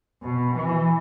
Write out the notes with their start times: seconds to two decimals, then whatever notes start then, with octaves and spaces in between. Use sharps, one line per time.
0.23 B2
0.55 E3